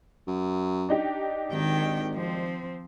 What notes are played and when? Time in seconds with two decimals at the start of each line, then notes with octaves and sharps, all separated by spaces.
0.27 F#2
0.89 D4 D#4 G4
1.52 G#1 D#3 G5
2.14 F3 C4